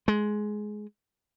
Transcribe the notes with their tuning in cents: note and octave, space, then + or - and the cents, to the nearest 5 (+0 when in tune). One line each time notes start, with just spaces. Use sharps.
G#3 +15